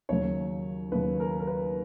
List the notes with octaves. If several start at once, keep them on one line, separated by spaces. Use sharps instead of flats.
D#2 C#3 F#3 C#5
D#2 C#3 F#3 B4
A#4
A#4
B4